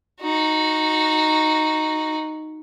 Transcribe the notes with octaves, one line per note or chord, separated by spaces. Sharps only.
D#4 F#4